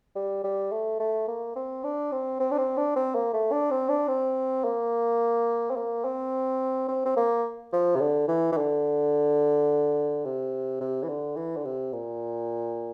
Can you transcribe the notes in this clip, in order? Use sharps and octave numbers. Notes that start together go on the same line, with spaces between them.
G3
G3
A3
A3
A#3
C4
D4
C4
C4
D4
C4
D4
C4
A#3
A3
D4
C4
D4
C4
A#3
C4
A#3
C4
C4
C4
A#3
F3
C3
D3
E3
E3
D3
C3
C3
E3
D3
E3
D3
C3
A#2